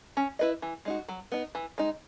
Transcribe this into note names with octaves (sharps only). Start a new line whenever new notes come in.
C#4
E4 B4 D#5
E3
G#3 D#4 F#4
F#3
B3 D#4
E3
G#3 D#4